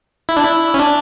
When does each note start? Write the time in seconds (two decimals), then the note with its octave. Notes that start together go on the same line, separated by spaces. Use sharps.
0.29 E4
0.37 D4
0.43 E4
0.74 C#4
0.79 D4